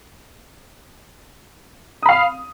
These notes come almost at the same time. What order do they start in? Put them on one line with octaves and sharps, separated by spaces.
D#6 B5 F5